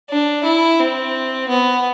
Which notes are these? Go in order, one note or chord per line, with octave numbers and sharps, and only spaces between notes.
D4
E4
C4
B3